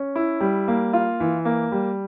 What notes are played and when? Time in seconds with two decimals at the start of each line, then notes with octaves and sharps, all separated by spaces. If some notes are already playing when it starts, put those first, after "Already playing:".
Already playing: C#4
0.16 E4
0.41 G3
0.68 A#3
0.93 F4
1.20 E3
1.45 A#3
1.72 G3